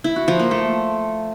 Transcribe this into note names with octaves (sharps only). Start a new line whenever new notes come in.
E4
F#4
F3
A#3
A3